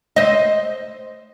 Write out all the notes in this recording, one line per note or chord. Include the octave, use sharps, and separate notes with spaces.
C5 D#5